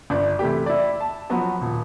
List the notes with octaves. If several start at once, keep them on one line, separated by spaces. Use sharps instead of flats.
G1 D5
C3 E3 A3 G4
E4 D5
A5
F3 F#3 B3 F#4
D#1